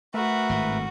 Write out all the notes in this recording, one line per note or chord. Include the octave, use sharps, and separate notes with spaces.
A3 F#4 A#4 B4 E5
G#1 A2